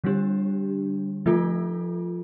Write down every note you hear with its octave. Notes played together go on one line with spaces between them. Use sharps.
D3 G3 D4 G4
F3 A3 F4 A4